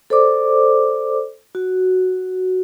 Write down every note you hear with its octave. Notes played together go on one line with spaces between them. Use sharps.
A4 C5 D5 D6
F#4